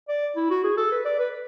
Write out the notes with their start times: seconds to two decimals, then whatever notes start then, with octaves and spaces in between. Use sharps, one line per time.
0.09 D5
0.36 E4
0.51 F#4
0.64 G#4
0.77 A4
0.92 B4
1.05 D5
1.19 B4